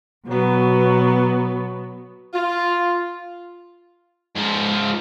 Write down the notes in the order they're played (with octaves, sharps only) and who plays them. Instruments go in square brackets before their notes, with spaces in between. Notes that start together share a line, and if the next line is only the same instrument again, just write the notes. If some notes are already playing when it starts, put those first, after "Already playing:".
[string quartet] B2 F#3 B3
[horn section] F4
[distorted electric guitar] G#2 F3